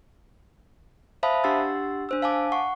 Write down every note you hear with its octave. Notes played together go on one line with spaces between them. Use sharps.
C5 E5 F5 A5 B5 D#6
D4 G4 F#5 C6 E6 A6
D4 C5 E6
F5 G#5 A5 D6
F#5 C#6